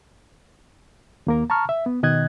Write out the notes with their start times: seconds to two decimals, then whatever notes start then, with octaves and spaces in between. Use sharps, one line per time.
1.27 D#2 A#3 A#4
1.50 A5 A#5 C#6 F6
1.69 E5
1.86 B3
2.03 B2 D#3 D#5 F#6 G#6